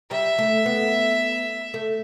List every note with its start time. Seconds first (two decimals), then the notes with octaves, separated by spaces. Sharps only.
0.11 G3 E5
0.38 A3
0.66 B3
1.74 A3